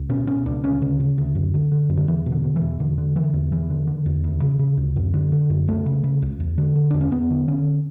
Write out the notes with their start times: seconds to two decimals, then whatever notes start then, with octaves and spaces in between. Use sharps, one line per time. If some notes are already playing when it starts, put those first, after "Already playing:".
Already playing: C#2
0.09 B2 C#4
0.27 B2 C#4
0.46 C#2 D4
0.64 D2 C#4
0.82 C#3
1.00 C#3
1.18 D2
1.35 F#2
1.54 D3
1.72 D3
1.89 F#2
1.97 D3
2.07 E2 E3
2.26 B2
2.32 D3
2.44 B2
2.56 E3
2.62 E2
2.79 E2 D3
2.98 D3
3.16 D3 E3
3.33 E2
3.52 E2 E3
3.70 D3
3.87 D3
4.06 E2
4.24 D2
4.42 C#3
4.59 C#3
4.77 D2
4.96 F#2
5.14 D3
5.32 D3
5.50 F#2
5.68 C#2 A3
5.86 C#3
6.04 C#3
6.22 C#2
6.40 E2
6.58 D3
6.75 D3
6.90 E2 D4
7.01 C#4
7.11 E2 B3
7.30 D3
7.48 D3 C#4